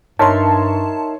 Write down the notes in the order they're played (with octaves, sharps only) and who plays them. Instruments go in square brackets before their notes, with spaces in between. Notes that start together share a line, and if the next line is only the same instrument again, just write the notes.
[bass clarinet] G2 [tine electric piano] D#4 A#4 E5 [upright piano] C#5 C6 [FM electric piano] A5